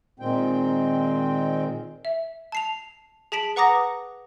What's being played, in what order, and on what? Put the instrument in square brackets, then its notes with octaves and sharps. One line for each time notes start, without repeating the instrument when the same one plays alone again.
[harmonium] A#2 D#3 G#3 C4 G5
[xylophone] E5
A5 C7 F7
G#4 A5 B6 D7 F#7
B4 F#5 A#5 D6 D#6 A#6